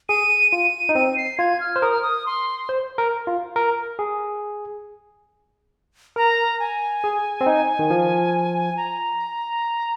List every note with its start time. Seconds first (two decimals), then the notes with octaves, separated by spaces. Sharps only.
0.09 G#4 D#7
0.52 F4 D#7
0.89 D#4
0.95 C4 D#7
1.17 C7
1.39 F4 G#6
1.61 F6
1.76 C5
1.82 A#4 D#6
1.92 F6
2.02 D#6
2.26 C6
2.69 C5
2.98 A#4
3.27 F4
3.56 A#4
3.99 G#4
6.16 A#4 A#5
6.60 G#5
7.04 G#4
7.41 C4
7.46 D#4
7.79 D#3
7.90 F3
8.77 A#5